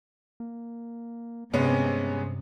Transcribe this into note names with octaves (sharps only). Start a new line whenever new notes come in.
A#3
G2 C3 G#3 B3 C#4